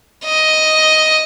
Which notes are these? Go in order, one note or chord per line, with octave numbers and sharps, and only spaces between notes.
D#5